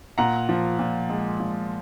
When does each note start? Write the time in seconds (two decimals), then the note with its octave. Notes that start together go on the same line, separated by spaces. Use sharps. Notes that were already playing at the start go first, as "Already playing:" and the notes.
0.18 A#2 F#5 A#5
0.49 F3
0.79 A#2
1.10 G#3
1.40 A#2